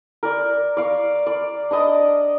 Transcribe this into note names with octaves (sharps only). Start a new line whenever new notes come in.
A#4 D5
D5 F5 C#6
D5
D4 D5 D#5 D#6